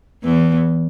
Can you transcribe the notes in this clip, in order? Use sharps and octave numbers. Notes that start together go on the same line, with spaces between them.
E2 E3